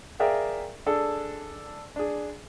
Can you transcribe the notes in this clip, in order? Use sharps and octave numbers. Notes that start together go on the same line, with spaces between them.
G#4 A#4 D5 E5 F5 G5
D4 G#4 A4
D4 G#4